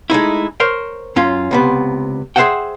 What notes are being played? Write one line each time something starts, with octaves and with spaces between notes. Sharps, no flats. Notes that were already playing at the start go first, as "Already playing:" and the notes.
G#3 A3 D#4 E4
A#4 C5 C#5
F#2 C#4 F4
C#2 C3 B3
G#4 C5 C#5 E5 F#5 G5